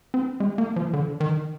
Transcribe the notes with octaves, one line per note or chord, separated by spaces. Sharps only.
C4
G#3
A#3
F3
D3
D#3